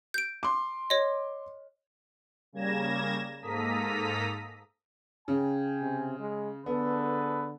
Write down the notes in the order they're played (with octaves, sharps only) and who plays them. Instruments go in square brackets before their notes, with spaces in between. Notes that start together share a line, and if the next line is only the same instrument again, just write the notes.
[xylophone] G6 D7
[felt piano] C6 D6
[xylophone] C#5 D#5
[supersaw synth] C#3 G3 A#3 G#6 A#6 E7
G#2 A#3 A4 A#5 D#6 B6
[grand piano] C#3 [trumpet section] G5 G#5
[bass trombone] C3
G#3
[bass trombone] D3 [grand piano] B3 [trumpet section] G#4 A4 B4